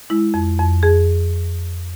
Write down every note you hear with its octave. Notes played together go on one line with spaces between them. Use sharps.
G#3 E4
F2
F2
F2 G#4